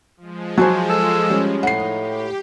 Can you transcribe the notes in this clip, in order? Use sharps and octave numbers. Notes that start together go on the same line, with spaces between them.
F3 G#3
F#3 C5 G#5 A5
A4
G3 C#4
A2 D#4 F#5 C7
G4